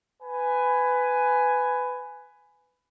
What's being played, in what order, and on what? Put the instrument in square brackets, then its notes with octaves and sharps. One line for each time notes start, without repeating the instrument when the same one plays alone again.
[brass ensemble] B4 G#5